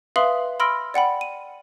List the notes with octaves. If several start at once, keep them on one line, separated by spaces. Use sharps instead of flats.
B4 E5 F5 C6 D#6 F#7
B5 C6 E6 F6 A#6 D7
D5 F#5 G5 B5
D#7